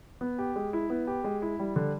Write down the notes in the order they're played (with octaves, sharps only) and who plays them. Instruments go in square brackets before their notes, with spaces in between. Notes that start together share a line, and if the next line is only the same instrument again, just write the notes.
[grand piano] B3
G4
G#3
E4
B3
G4
G#3
E4
G3
D3